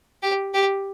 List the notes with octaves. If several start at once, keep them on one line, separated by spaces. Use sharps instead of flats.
G4
G4